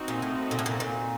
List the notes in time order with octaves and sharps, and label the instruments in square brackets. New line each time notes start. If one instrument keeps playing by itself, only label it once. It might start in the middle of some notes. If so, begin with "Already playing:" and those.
Already playing: [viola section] C4 D#4 F#4
[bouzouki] A#2
A2
A#2
A2
A#2
A#2